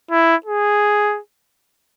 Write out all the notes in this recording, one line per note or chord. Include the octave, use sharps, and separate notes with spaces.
E4
G#4